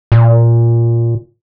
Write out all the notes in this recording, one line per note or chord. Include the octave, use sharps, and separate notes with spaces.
A#2